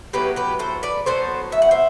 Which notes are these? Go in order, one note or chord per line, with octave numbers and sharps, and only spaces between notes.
A2 F#3 B3 G4 B4
G4 B4
A4 C5
B4 D5
A2 F#3 B3 A4 C5
E5
F#5
C5 E5